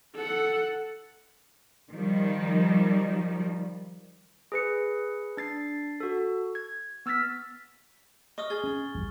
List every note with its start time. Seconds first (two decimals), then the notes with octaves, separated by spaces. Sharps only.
0.16 A4 F#5
1.93 D#3 F3 G3
4.52 G#4 B4 C#7
5.37 D4 A6 C7
6.00 F#4 A4
6.55 G#6
7.06 B3 E6 F6 A6 B6
8.38 D#5 C#6 D#6 F6
8.50 G#4 A6 G7
8.64 C#4
8.95 A#1 E2 G2